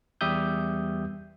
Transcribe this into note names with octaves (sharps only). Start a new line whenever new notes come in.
E2 G3 G4 E5 D#6 G6